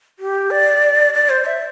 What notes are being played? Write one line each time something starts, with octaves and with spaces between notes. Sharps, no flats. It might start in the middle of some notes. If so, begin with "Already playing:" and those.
G4
D5
D5
C5
E5